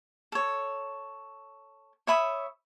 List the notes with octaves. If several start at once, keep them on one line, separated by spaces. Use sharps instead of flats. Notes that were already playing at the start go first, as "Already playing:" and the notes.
A4 C#5
C#5 E5 B5 D#6